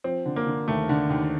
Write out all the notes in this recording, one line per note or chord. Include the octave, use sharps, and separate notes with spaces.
F3 C4
D3
A#3
D3
D#2 A3
D3
D#2